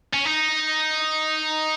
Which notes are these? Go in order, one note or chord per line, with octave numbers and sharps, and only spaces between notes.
C#4
D#4